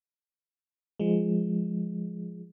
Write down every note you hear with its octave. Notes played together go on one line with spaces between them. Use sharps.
F3 G#3